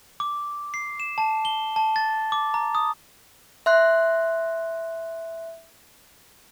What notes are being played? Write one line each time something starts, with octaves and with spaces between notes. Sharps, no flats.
D6
C7
E7
A5
G7
A5
A6
D6
A#5
D#6
E5 C6 F#6